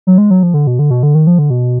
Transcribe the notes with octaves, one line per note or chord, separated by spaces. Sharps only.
F#3
G#3
F#3
F3
D3
B2
D3
B2
D3
D#3
F3
D3
B2